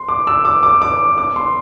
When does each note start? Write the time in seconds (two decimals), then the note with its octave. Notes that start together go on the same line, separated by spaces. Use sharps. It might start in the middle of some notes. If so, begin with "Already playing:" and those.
Already playing: C6
0.09 D6
0.27 E6
0.45 D6
0.63 D6
0.82 D6
1.18 D6
1.36 C6